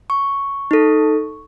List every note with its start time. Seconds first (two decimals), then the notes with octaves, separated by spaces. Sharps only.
0.10 C#6
0.71 D#4 A4